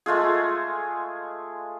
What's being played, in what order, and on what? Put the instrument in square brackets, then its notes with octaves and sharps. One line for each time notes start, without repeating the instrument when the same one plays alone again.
[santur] G#3 A3 F4 G#4